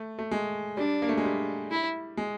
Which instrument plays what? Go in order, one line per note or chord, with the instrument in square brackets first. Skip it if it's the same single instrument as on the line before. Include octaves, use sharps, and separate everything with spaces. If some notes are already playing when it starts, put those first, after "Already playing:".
Already playing: [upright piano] A3
A3
G#3
[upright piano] G3 [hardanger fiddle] D4
[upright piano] A#3
A3
G#3
G3
[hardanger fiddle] E4
[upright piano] G#3